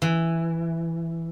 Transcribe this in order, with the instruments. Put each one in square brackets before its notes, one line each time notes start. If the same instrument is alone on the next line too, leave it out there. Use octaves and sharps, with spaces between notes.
[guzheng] E3